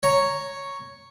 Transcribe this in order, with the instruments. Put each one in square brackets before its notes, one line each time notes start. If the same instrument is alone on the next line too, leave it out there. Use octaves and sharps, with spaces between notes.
[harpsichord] C#5 A#5